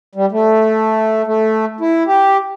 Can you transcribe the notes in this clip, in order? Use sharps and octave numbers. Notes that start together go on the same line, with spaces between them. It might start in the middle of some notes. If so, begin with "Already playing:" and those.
G3
A3
A3
E4
G4